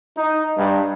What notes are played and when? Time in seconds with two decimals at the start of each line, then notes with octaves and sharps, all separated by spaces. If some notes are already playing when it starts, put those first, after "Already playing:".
0.17 D#4
0.58 G2